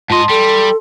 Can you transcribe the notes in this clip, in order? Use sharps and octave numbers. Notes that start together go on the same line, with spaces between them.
G#2 F4 D#5 A5 C6
G3 A4